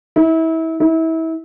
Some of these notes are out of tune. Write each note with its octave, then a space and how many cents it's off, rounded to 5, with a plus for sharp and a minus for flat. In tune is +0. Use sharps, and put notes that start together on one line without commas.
E4 -30
E4 -30